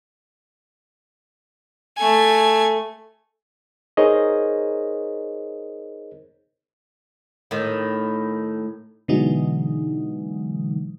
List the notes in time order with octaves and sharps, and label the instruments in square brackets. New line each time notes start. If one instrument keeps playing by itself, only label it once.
[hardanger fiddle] A3 G#5
[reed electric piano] D#4 G#4 A#4 C5 C#5 D#5
[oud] A2 D#3
[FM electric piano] B2 D3 E3 F#3 G#3 D#4